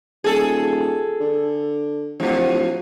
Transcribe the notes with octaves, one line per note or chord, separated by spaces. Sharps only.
D#1 G#4 A4
D3
D1 A2 F3